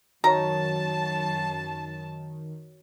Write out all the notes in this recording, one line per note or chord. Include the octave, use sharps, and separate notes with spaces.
F#2 D#3 F#4 C#5 A5 A#5